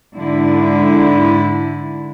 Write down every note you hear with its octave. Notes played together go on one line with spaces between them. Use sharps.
G#2 D3 E4